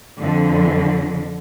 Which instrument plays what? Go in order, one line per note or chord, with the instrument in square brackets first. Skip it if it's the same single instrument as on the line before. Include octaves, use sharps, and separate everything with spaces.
[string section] F2 D3